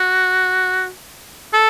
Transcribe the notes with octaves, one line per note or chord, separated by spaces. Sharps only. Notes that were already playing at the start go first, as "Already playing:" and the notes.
Already playing: F#4
A4